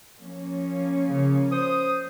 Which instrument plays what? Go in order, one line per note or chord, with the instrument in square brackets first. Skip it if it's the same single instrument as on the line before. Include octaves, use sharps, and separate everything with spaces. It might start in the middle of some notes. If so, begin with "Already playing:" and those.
[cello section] F3 A#3 C#4
[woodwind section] C#3
C5 D#6